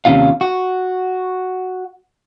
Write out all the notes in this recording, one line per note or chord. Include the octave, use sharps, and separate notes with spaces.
D#2 C3 F#3 C#4 F4 F5
F#4